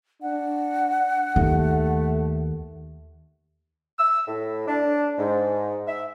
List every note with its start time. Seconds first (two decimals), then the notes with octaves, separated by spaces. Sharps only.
0.22 D4 F#5
1.36 D#2 A3
3.99 E6
4.28 A2
4.68 D4
5.18 G#2
5.88 E5